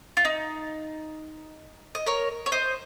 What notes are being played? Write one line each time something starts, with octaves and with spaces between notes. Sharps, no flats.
F4
D#4
D#5
A#4 C#5
C#5
C5 D#5